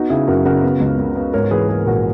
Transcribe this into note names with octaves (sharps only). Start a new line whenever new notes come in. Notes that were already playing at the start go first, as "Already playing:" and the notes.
Already playing: B3 D#4 F#4
C#3 E4 G#4
F#2 F#4 A#4
C#3 F#4 A#4
B3
C#2
C#3
B3
G#2 A#4 C#5
E3 G#4 B4
A#3 G#4 B4
A#1 F#4 A#4